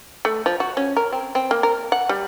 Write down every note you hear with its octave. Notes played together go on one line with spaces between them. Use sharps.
A3
F3
F#4
C#4
A#4
C4
C4
A#3
A#4
F#5
G3